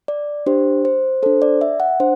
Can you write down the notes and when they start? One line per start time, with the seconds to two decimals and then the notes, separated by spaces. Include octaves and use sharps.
0.08 D5
0.46 D4 G4 C5
0.85 C5
1.23 D4 A4 C5
1.42 D5
1.61 E5
1.80 F#5
2.00 D4 C5